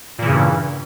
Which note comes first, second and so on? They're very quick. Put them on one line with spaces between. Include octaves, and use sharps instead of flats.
A#2 E3 C#3 G2